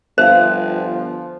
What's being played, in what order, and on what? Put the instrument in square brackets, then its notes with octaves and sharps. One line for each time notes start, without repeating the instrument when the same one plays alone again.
[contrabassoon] G1 [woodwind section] F3 [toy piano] C5 [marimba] E5 F5